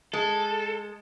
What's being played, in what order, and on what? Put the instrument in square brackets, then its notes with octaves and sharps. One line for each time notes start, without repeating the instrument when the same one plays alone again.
[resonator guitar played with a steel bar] G#3 [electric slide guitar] A4